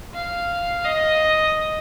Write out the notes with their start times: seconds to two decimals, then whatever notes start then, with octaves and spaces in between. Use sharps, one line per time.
0.14 F5
0.85 D#5